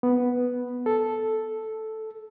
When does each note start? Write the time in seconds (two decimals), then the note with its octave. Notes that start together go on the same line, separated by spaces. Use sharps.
0.03 B3
0.86 A4